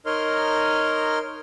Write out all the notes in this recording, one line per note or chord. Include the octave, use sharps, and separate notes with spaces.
D#4 A#4 C#5 D#5 C6 F6